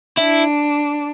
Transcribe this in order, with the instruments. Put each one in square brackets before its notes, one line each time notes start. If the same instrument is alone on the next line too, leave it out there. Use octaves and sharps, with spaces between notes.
[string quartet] D4 [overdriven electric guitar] E4